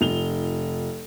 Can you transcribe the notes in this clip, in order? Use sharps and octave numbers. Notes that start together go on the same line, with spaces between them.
F1 F7 G7